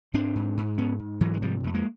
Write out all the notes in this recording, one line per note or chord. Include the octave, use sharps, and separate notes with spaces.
G#2 C4 D4
G#2
G#2
G#2 B3 C#4
G#2
G#2 E3 F#3
G#3
C3 F3 G3
F2 A3
G#3 A#3